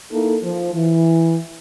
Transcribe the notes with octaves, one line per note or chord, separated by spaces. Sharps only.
A#3 D#4 E4 A4
F3
E3